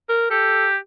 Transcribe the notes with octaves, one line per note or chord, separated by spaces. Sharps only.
A#4
G4 A4